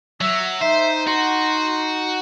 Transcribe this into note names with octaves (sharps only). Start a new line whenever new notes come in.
F#3 E5
D#4 C5 E5
F#4 C6